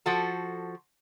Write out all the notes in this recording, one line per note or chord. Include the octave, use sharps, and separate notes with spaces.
F3 F#4 A4